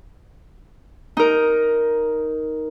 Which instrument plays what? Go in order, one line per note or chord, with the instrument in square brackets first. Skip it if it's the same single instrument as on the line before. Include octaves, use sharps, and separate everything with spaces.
[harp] D#4 A#4